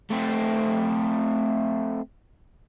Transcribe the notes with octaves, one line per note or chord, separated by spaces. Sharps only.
A3 C4